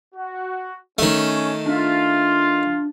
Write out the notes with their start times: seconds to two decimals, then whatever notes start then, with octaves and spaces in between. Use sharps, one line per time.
0.14 F#4
0.98 D#3 A3 C#4
1.66 D4 F4 E5